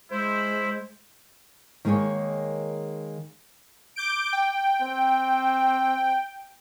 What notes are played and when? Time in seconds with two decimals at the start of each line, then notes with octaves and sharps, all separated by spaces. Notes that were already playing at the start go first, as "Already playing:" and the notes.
0.11 G#3 E4 C5
1.85 D#3 G#3 A#3 G#4 C#5
3.96 D6 G6 D7
4.33 G5
4.81 C4